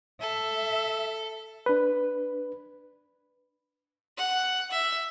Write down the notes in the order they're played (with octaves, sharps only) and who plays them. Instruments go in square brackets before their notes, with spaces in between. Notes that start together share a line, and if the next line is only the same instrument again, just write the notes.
[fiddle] A4 [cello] E5
[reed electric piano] D4 B4
[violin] F#5
E5